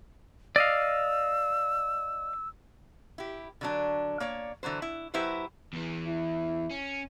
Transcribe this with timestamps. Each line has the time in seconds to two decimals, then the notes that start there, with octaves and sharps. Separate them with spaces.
0.56 D5 D#5 F5 E6
3.18 E4 G4
3.61 D3 F#3 D4
4.20 A#3 C#5 D5
4.63 D3 E3 F#3 C5
4.82 E4
5.14 F#3 E4 G4 B4 C5
5.73 E2 E3
6.07 E4
6.70 C#4